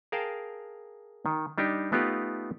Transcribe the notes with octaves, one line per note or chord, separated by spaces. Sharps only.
G#4 A#4 F5 G5 A5
D#3
G3 D4 D#4 G4
A3 B3 D#4 F4 G4 B4